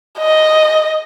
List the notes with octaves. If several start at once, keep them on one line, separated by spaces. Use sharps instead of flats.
D#5